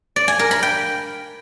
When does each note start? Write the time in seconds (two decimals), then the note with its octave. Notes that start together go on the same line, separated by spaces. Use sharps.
0.16 D5
0.28 G#5
0.39 A#4
0.51 B5
0.63 G5